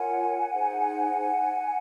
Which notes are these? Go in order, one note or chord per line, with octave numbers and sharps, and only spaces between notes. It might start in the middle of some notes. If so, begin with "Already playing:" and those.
Already playing: F4 A#4 C#5 F#5 G#5
D#4 G#4 C5